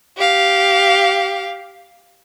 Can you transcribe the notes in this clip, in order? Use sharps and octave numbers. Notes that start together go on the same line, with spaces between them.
G4 F5